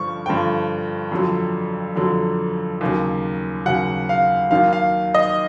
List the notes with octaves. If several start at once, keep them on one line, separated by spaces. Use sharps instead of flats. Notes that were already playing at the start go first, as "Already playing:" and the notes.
Already playing: G2 D3 F3 C#6
G2 D3 F3 G5
F2 D3 F#3
F2 D3 F#3
D#2 C#3 F#3
D#2 C#3 F#3 F#5
F5
D#2 D#3 F#3 F5
F5
D#5